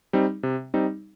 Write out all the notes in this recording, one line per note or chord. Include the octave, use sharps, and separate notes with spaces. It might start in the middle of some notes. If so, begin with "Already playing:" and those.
G3 C4 D#4
C3
G3 C4 D#4